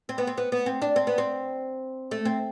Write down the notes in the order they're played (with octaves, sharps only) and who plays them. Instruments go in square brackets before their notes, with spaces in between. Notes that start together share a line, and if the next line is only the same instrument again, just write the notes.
[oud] C4
B3
C4
B3
B3
C4
D4
C4
B3
C4
A3
C4